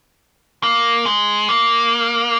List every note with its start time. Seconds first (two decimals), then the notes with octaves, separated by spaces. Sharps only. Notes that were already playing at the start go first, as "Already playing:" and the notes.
0.63 A#3
1.06 G#3
1.49 A#3